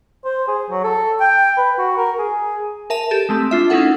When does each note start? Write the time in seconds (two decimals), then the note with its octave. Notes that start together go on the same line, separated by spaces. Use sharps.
0.25 C5
0.47 G#4
0.70 F#3
0.84 A4
1.20 G5
1.57 B4
1.78 F#4
1.97 A#4
2.19 G#4
2.90 A#4 E5 A5 D#7
3.11 G4 A4
3.29 G#3 A3 C4
3.51 D4 F4 E5
3.70 C#4 D#4 E4 A4 F#5